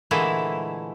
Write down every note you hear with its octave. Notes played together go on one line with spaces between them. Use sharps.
A#2 D3 E3 G#3 A3 E4